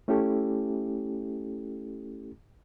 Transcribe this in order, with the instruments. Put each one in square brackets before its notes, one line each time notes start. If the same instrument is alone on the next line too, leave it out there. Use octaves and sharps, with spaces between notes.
[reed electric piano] A3 C#4 E4 G4 A4